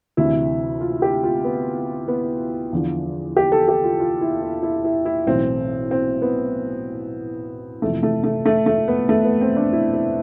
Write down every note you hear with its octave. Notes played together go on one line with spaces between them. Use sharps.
D2 C3 E3 E4
F4
G4
F4
B3
B3
E2 D3 F3
G4
A4
G4
F4
F4
E4
E4
E4
E4
E4
B1 A2 E3 C4
C4
B3
F1 F2 E3 A3
A3
A3
A3
A3
B3
A3
B3
C4
D4
E4
E4